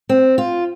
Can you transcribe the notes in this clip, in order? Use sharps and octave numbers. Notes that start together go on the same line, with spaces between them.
C4
F4